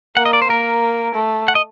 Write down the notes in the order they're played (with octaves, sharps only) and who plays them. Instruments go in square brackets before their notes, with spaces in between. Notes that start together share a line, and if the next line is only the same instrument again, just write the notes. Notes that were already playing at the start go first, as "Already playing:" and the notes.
[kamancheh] A#3 [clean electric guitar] F#5
[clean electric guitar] D#5
D5
C5
[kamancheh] A#3 [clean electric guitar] A#4
[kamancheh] A3
[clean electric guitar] F#5
D#5